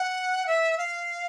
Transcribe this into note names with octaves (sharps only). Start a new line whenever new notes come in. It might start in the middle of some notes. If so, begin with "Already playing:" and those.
Already playing: F#5
E5
F5